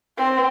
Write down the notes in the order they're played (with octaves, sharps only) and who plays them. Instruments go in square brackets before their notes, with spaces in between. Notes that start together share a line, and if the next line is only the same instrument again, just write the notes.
[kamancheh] C4